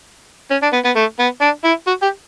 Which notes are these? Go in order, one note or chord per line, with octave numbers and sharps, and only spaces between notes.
C#4
D4
B3
B3
A3
B3
D4
E4
F#4
G4